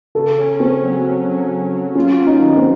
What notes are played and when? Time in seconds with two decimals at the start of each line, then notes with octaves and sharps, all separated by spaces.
0.15 C#3 A4
0.38 C#4
0.60 C4 C#4
0.83 F#3
1.05 F#3
1.28 F#3
1.50 C#4
1.73 F#3
1.95 C#4 F4
2.19 F4
2.27 D#4
2.41 D#3
2.57 C4